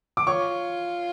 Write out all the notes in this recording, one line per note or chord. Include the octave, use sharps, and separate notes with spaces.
D6
F4 C#5 C#6